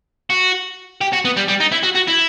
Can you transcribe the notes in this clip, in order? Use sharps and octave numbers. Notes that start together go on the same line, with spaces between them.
F#4
G4
F#4
B3
G3
G3
D#4
E4
F#4
F#4
E4